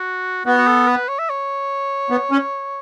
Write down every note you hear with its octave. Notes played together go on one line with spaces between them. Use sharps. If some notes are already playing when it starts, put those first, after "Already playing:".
Already playing: F#4
B3 F#4
F#4
A4
B4
C#5
E5
C#5
B3
C#4